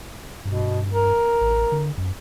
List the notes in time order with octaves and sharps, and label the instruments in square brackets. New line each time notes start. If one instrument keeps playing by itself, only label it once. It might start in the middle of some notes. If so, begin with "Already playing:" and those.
[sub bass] G2 [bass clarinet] B2
[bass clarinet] A#4
[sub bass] A1
D3
F#2